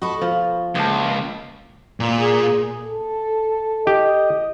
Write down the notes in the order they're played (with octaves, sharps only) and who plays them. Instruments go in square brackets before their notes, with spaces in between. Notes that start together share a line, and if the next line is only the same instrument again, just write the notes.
[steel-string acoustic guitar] F#4 A4 [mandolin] D#5 B5 C#6
[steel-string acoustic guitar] B2 [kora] F3
[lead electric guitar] C#2 [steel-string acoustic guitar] A#3 [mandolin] G#4 E5 A5
[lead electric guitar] A#2
[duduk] G#4
[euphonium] A4
[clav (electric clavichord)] G4 [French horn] D#5